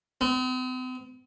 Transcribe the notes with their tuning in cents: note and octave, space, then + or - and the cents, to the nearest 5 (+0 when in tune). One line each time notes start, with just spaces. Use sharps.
C4 -45